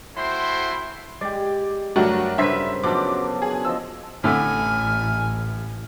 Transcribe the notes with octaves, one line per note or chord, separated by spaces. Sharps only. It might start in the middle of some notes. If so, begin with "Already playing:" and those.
A3 E4 F#4 C5 G5 C6
G#3 G4 D5
G2 F#3 A3 D4 F#4 A#4
G2 C#3 B4 C5 E5 B6
F#2 B2 F3 F#3 D4 D6
G#4
F3 D#5 E6
A1 A2 D3 A3 G#5 F6